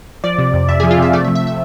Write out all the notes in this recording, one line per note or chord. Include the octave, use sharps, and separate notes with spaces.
F3 D5
C3
F2
F2 E5
G#4 G#5
F3
F4 F5
C3 E5
A3 D5
E5
F3
E5
E5